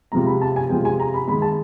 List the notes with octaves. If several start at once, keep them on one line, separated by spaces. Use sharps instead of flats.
C3 F3 G#3 A#5
B5
A5
G#5
C3 F3 G#3 G5
G#5
A#5
B5
D#3 G#3 B5
A5